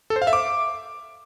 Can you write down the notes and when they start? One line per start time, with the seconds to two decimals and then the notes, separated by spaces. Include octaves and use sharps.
0.10 A4
0.16 C5
0.22 F5
0.27 E5
0.33 D6